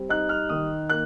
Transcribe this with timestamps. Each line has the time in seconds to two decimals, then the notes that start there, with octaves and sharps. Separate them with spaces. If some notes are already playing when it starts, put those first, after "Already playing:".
Already playing: G3 C4
0.09 D#4 F#6
0.29 F6
0.49 D#3 D#6
0.90 A#3 F#6